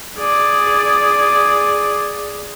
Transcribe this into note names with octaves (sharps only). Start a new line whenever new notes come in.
G#4 D5